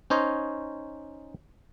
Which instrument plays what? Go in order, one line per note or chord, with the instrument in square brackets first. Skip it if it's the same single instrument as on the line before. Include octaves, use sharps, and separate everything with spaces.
[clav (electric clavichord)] C#4 D#4 C5 C#5 D#5